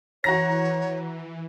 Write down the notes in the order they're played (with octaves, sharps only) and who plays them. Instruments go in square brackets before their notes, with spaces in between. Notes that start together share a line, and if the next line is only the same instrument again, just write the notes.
[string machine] E3 [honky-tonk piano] F#4 A#5 A#6 [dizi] C#5